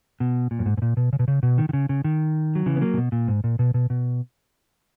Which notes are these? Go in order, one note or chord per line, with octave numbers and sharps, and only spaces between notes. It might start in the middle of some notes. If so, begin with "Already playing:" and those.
B2
A#2
F#2
G#2
G#2
A#2
B2
C#3
B2
C#3
B2
D#3
D#3
C#3
C#3
D#3
F#3
C#3 E3
B3
F#3 A#3
C#3
B2
A#2
G#2
A#2
B2
B2
B2